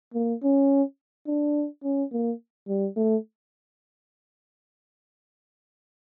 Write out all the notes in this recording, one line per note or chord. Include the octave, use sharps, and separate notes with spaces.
A#3
C#4
D4
C#4
A#3
G3
A3